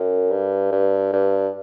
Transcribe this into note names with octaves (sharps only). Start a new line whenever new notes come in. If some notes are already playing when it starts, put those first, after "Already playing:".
Already playing: F#2
G2
G2
G2